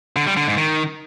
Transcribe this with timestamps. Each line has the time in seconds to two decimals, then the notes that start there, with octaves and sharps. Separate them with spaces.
0.16 D3
0.27 G3
0.37 D3
0.47 G#2
0.57 D#3